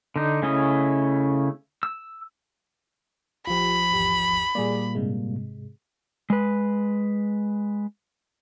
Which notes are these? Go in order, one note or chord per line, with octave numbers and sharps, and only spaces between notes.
D3 D#4
C#3 A3 C#4 E4 D#5
E6
A#1 F3 F4 G4 B5
G#1 E2 G4
A#2 G3 A#3 G#4 D5
G#2 C3 G#3
G#3 B4